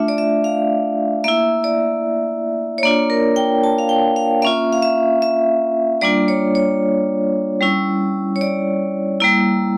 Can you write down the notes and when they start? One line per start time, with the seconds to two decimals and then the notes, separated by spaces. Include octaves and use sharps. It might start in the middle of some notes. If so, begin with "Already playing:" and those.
Already playing: A3 D4 F4 E5
0.08 D5
0.18 E5
0.44 F5
1.24 A#3 E4 E5
1.64 D5
2.78 C#5
2.83 A#3 D4 F4 D5
3.10 A#4
3.36 G5
3.64 A5
3.79 F5
3.89 G5
4.16 F5
4.42 A#3 C#4 F4 E5
4.73 F5
4.82 E5
5.22 E5
6.01 G3 A#3 D4 F4 D5
6.28 C#5
6.55 C#5
7.61 G3 C#4 E4
8.36 C#5
8.41 D5
9.20 G3 A#3 E4